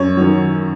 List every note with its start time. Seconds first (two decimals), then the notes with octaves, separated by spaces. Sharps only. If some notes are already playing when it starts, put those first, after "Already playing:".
Already playing: F#2 C#5
0.17 D#3 F#3